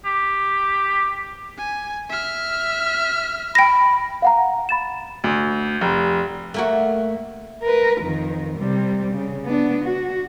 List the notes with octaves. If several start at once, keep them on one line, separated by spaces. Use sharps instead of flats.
G4
G#5
E5 F6
G5 B5 A#6
F5 F#5 A#5
B5 A6 E7
D2
F1
A3 A#3 F#4
A#4 B4
F2 D#3
C3 G3
C#3
B3 D4
F#4